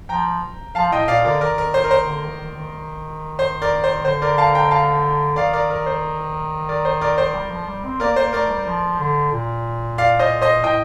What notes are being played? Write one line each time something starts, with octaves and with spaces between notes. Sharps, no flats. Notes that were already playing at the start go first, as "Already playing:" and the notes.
F3 G5 A#5
F3 F5 A5
A2 D#5 G5
A#2 D5 F5
D3 A#4 D5
D#3 A#4 D5
A#4
C5
A#4
C5
D3
D#3
D#3
D#3
C5
A#4 D5
C5
D3 C5
A#4 D5
F5 A5
G5 A#5
F5 A5
D#3 D5 F5
A#4 D5
A#4
C5
A#4 D5
C5
A#4 D5
C5
G3
F3
G3
C4
A#3 A#4 D5
A#3 C5
A3 A#4 D5
G3
F3
D3
A#2
D5 F5
C5 D#5
C5 D#5
A2 D#5 G5